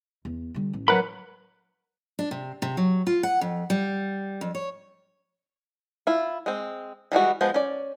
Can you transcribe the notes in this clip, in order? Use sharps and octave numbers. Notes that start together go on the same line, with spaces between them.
E2
D3 G3
A1
F#3 A#4 B4 F#5 B5
D4
C3
C3
F#3
F4
F#5
F2
G3
F2
C#5
E4 F4
G#3 C4
E3 G3 G#3 F#4
F3 G#3 B3 C5
C#4 D5